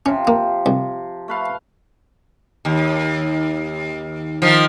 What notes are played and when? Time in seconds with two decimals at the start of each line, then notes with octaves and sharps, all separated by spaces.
0.06 C3 F3 C#4
0.27 A#3
0.66 C2
1.28 A3 B4 F5
2.65 D#2
4.42 D#3 F3